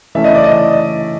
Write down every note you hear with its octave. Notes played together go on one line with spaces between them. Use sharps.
C#3 E3 A3 C#4 E5
D#5
D5
D#5